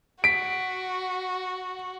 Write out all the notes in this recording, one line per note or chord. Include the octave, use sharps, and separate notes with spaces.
F#4 B6 D7